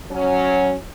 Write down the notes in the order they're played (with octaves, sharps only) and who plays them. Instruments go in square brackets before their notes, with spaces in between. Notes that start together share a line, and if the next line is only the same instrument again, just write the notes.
[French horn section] F#3 C#4